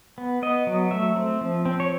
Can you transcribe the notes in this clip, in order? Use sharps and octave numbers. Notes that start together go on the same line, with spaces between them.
B3
B3 D#5
F#3
A3 E5
C4
F3
C4
C#5